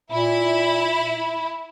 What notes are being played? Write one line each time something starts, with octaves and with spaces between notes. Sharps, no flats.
A#2 E4